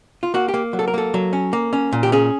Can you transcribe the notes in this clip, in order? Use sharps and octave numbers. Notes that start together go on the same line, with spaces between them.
F4
A#3 F#4
G4
A#3
F#3
A4
A#4
A#3 A4
F#3
C#4
A#3
C#4
A#2
G4
C#4 G#4